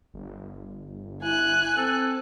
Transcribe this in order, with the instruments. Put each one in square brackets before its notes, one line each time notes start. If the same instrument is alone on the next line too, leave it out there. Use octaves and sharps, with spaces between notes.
[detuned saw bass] G1
[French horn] E4 [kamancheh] G#5 F#6
[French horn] C4 [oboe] A4